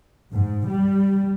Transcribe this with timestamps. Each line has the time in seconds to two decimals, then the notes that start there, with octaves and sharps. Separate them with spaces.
0.33 G#2
0.68 G3